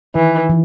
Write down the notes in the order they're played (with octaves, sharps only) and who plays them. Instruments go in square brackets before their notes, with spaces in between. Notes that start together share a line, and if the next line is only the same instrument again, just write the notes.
[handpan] D#3 [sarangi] E3
[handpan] E3